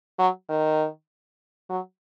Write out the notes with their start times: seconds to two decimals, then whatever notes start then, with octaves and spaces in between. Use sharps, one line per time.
0.19 F#3
0.49 D#3
1.70 F#3